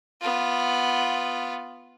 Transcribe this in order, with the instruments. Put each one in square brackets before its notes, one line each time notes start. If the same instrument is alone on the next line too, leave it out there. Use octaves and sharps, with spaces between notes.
[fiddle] B3 F4